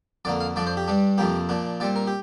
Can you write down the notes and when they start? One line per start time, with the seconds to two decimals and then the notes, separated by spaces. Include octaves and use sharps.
0.25 F2 D3 A#3 D5
0.41 F5
0.56 F2 F3 D4 D5
0.67 C5
0.77 G4
0.88 G2 G3 D4
1.18 F2 C3 F3 A#3 G4
1.49 A#2 F3 D4
1.80 A#2 G3 C4 D5
1.96 A#4
2.07 G4